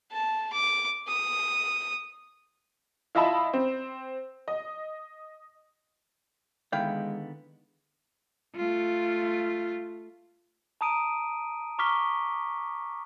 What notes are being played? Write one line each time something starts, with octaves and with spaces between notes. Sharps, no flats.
A5
D6
D#6
E4 F4 D#5 E5 A5 B5
C4
D#5
D3 D#3 G#3 B3 E4 F5 G5
A3 F4
A5 A#5 D#6 D7 D#7
A#5 C#6 D6 F6 B6 G7